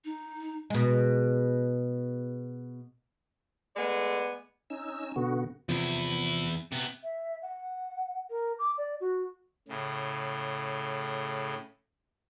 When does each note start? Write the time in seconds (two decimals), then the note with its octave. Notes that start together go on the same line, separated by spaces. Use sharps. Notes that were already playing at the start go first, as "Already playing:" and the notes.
0.05 D#4
0.70 B2 G#3
3.76 G#3 A3 B3 D5 G#5
4.70 C#4 D#4 E6
5.16 B2 D3 B3 F#4
5.69 E2 C3 F3 E4
6.72 C3 B3
7.03 E5
7.42 F#5
8.30 A#4
8.59 D6
8.78 D5
9.01 F#4
9.68 A2 C#3